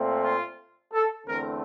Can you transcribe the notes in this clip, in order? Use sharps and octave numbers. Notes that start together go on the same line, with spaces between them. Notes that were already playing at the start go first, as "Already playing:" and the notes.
Already playing: A#2 A3 C4
F4
A4
E2 D3 A3 C4 A#4